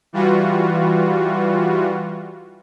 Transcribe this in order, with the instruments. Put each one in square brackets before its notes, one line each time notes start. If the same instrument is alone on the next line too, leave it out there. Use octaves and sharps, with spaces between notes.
[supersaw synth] E3 G3 F4 F#4